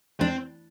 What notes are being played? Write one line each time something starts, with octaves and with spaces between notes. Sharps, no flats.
C4 D4